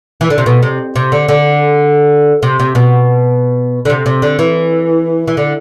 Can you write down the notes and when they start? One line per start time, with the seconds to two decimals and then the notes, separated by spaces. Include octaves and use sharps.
0.21 E3
0.30 D3
0.38 C3
0.46 B2
0.63 C3
0.96 C3
1.12 D3
1.28 D3
2.43 C3
2.59 C3
2.75 B2
3.85 D3
3.90 C3
4.06 C3
4.22 D3
4.39 E3
5.27 E3
5.37 D3